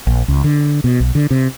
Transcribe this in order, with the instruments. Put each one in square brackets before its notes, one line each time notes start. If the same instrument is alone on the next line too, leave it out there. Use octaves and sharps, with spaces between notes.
[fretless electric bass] A#1
C#2
D3
B2
B1
D3
C3